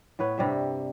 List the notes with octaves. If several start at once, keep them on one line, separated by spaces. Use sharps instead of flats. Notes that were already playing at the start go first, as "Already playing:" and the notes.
A2 B3 B4 C#5
G2 C3 G3 E5